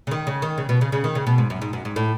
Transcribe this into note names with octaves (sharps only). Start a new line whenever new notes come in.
C#3
D#3
C#3
D#3
C#3
B2
C#3
C#3
D#3
C#3
B2
G#2
F#2
G#2
F#2
G#2
A2